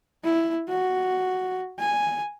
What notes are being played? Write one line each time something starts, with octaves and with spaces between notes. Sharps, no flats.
E4
F#4
G#5